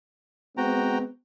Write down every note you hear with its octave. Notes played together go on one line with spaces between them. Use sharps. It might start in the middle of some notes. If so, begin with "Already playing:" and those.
G#3 B3 C4 F#4 G5 A#5